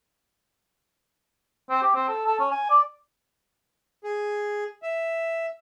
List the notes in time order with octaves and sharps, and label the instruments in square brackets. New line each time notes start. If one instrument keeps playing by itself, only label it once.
[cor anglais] C4
G4
C4
A4
A4
C#4
G#5
D5
[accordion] G#4
E5